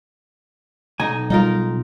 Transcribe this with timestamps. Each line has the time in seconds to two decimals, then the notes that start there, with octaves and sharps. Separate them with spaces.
1.00 B1 D#4 G#5
1.30 G3 D#4 F4 A#4